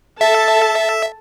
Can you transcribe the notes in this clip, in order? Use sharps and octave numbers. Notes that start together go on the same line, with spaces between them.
A4 E5 A5